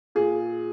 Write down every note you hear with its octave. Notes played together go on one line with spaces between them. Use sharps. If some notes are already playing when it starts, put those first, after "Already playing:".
A#2 G#4